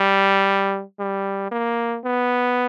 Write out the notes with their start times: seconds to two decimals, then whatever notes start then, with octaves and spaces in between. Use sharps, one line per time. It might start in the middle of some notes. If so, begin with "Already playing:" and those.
Already playing: G3
0.99 G3
1.51 A#3
2.04 B3